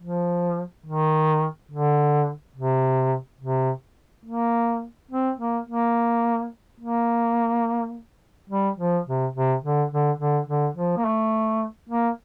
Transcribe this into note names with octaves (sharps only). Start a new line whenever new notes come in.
F3
D#3
D3
C3
C3
A#3
C4
A#3
A#3
A#3
G3
F3
C3
C3
D3
D3
D3
D3
F3
A#3
A3
A#3